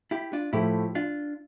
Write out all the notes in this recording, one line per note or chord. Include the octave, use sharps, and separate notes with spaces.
E4 G4
D4 F4
A2 F3 A3 E4 G4
D4 F4